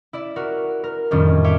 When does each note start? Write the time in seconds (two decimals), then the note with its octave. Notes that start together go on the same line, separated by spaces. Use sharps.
0.13 E4 D5 E5
0.36 F#4 A#4
0.84 A#4
1.11 F2 A2 D#3 G3 C#4 D4
1.44 C#5 E5 F5 G5 D6